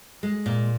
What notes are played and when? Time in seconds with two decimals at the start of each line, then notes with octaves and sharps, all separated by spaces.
0.23 G#3
0.46 A#2